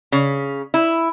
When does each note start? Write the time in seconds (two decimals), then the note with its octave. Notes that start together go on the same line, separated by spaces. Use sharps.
0.12 C#3
0.74 E4